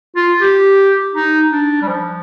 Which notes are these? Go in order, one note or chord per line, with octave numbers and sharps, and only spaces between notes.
F4
G4
D#4
D4
G3
F3